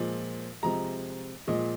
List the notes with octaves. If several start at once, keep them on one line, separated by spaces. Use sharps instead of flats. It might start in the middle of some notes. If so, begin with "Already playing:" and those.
Already playing: A#2 F3 G#3
C3 F3 G#3 A#5
A#2 F3 G#3 D#5